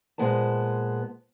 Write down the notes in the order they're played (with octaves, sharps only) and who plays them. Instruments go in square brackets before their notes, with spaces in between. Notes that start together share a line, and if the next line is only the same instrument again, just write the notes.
[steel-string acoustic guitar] A#2 G#3 B3 C5 A5